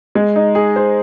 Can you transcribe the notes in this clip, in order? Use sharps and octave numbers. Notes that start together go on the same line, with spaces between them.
G#3
D#4
G#4
C5